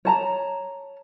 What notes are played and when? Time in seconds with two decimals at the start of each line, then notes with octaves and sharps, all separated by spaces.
0.05 C#5 A5 A#5